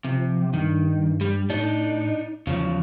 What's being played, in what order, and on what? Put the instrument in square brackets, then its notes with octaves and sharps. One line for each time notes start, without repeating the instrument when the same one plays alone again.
[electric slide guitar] C3 [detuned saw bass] F3
[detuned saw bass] G2 [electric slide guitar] D#3
[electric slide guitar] G3
[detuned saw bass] A2 [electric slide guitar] D4 D#4
[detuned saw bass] E2 [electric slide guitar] C#3 F3 F#3